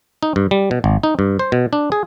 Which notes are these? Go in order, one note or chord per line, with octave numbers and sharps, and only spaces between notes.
D#4
G2
G3
B2
G#1
D#4
G2
C5
B2
D4
G#4